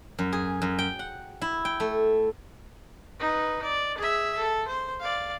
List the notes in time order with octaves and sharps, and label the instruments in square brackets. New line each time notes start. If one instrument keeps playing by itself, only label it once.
[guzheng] F#2
G#4
F#2
G5
F#5
E4
G5
A3
[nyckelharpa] D#4 B4
D5
G#4 E5
A4
C5
D5 F5